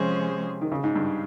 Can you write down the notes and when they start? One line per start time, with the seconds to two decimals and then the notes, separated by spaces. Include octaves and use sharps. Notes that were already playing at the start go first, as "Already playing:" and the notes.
Already playing: C3 F3 G#3 C#4 G#4 C5
0.61 D#3
0.72 C#3
0.84 G#2
0.96 G2